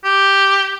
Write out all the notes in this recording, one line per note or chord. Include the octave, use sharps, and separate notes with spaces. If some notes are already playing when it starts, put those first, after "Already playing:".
G4